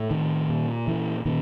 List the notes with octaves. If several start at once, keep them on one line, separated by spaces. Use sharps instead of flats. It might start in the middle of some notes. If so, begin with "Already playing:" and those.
Already playing: A2
D#3
A#2
E3
A#2 D#3